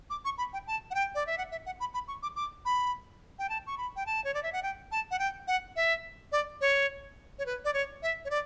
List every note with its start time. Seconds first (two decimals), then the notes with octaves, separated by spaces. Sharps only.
0.10 D6
0.25 C#6
0.38 B5
0.53 G5
0.67 A5
0.91 F#5
0.95 G5
1.15 D5
1.27 E5
1.38 F#5
1.52 E5
1.66 F#5
1.80 B5
1.94 B5
2.08 C#6
2.23 D6
2.36 D6
2.65 B5
3.39 G5
3.49 A5
3.67 C#6
3.78 B5
3.96 G5
4.06 A5
4.24 C#5
4.34 D5
4.43 E5
4.53 F#5
4.63 G5
4.92 A5
5.11 F#5
5.19 G5
5.48 F#5
5.76 E5
6.32 D5
6.61 C#5
7.39 C#5
7.46 B4
7.65 D5
7.74 C#5
8.03 E5
8.25 C#5
8.30 D5